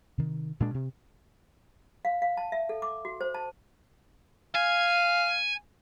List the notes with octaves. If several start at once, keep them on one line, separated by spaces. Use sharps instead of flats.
C3 D#3
A#2 G#3 D4
C3
F5
F5
A5
E5
A4
D6
F#4
C5
A5
F5 G#5